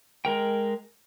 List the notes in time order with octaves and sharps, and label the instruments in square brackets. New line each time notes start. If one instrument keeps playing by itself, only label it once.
[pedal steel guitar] G#3 A#4 G5